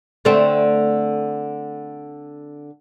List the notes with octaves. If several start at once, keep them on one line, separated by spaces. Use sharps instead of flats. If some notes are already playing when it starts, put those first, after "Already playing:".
D3 A3 C4